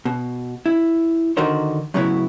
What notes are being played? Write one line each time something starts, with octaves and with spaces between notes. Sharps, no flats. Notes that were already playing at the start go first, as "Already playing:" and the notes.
B2
E4
D3 D#3 D#4 F#4 A#4 C5
F#2 A2 C#3 F#3 B3 E4